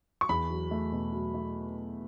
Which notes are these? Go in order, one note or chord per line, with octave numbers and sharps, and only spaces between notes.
C#6
E2 B5
F#3
A3
B2
F#3
A3